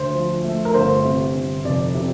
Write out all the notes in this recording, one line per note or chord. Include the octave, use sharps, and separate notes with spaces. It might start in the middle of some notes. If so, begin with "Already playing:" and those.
Already playing: D2 C5
F3
A3
A#4
G1 C5
C3
G1
F1 D5
C3